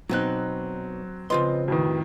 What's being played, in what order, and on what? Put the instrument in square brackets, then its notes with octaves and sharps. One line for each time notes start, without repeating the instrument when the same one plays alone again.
[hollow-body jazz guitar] B1 B2 D#4 [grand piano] F#3 C4 F#6
[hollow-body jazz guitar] C#3 F4 C6 [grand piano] F3 C4 [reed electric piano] B4 D#5
[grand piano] F2 A2 D#3 [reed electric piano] F#4 B4